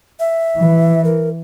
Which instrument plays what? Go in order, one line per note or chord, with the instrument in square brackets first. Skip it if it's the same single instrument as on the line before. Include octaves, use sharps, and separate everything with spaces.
[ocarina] E5
[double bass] E3
[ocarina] A#4